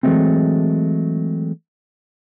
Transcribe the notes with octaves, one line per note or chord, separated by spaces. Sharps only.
E3 F#3 G#3 A3 C4